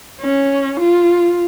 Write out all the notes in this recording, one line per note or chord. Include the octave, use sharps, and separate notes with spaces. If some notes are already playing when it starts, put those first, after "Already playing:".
C#4
F4